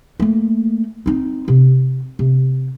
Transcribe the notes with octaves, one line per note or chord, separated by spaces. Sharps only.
A3 A#3
C4 D#4
C3
C3